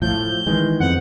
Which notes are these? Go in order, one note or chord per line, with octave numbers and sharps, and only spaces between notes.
A2 F3 G6
D#3 E3 G#3
F2 F3 B3 F#5